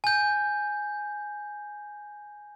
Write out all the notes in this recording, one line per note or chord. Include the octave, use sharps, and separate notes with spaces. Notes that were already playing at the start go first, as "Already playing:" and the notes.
G#5 G6